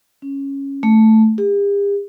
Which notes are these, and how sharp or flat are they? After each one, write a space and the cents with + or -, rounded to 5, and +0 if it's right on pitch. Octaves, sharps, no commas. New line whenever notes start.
C#4 -5
A3 +0
G4 +45